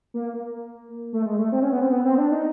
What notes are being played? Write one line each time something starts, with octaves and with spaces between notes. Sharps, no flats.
A#3
A#3
A3
G#3
A3
C4
C#4
B3
C4
B3
C4
D4
D#4